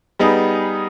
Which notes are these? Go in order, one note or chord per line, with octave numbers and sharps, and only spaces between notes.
G3 B3 D#4 G#4